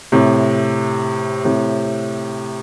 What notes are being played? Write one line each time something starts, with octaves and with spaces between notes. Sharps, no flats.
A2 C3
A2 C3